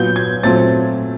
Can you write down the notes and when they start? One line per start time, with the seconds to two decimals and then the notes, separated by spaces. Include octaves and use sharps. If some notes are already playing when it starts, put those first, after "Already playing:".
Already playing: A#2 F#3 B3 G6
0.16 G#6
0.43 A#2 F#3 A3 C4 A6